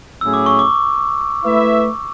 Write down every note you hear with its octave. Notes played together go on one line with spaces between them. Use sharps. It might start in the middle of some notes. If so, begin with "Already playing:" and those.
A2 F#3 C#4 E4 G#4 E6
D6
C#6
D6
A3 E4 B4 E5